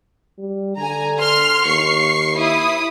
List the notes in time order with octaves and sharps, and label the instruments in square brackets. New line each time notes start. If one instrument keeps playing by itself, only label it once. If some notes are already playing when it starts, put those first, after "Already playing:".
[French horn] G3
[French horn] D3 [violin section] G#5 A#5
[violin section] C6 F6
[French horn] D#2 [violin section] C#6 C7
[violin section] E4 D#6